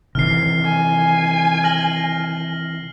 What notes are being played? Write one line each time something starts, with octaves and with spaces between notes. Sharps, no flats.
C3 D#3 E3 F6 C7
G#5
F6 A#6 F#7